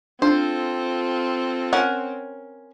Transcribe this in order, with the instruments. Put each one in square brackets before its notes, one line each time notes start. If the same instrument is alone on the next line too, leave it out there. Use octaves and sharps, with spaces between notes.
[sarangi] C4 [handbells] D4 [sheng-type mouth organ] F4 A4 [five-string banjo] C5
[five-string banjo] C#4 A#4 F#5